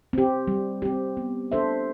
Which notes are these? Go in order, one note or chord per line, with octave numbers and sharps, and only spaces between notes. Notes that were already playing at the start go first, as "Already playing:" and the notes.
C4 G4
G3
C4 G4
B3
D4 A4 C5 E5